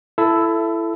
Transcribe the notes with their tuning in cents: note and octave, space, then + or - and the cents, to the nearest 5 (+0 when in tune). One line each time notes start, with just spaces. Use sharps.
E4 +20 A4 +0